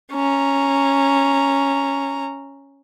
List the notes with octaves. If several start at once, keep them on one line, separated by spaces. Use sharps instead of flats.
C#4 A#5